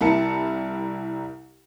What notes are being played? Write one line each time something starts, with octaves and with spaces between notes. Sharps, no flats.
C2 E4 A#4 A5 C#7